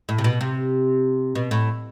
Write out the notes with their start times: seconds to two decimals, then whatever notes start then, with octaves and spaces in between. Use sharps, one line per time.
0.09 A2
0.18 C3
0.24 B2
0.41 C3
1.35 B2
1.51 A2